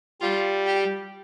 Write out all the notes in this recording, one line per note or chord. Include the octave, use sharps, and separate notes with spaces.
G3 F4
G4